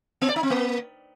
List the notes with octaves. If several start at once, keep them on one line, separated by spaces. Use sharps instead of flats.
B3
D5
D#4
C4
A#3